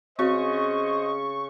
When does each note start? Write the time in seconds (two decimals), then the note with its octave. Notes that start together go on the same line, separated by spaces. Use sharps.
0.19 C#3 C4 F#4 C5 D#5 C#6